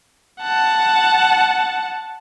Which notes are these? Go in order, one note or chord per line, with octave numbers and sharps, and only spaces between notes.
F#5 A5